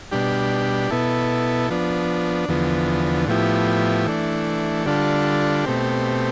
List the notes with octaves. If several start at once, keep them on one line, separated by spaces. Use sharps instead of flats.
B2 G3 D4 G4
B2 B3 E4 A4
F3 B3 D4
E2 D3 F3 B3
A2 F3 B3 E4 G4
E3 A3 D4
D3 G3 D4 F4 A4
B2 A3 C4 G4